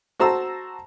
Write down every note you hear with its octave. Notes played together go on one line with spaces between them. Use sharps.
F#4 C5 A5 A#5 E6